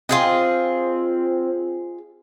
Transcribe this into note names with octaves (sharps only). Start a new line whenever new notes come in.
C4 F4 G#4 D#5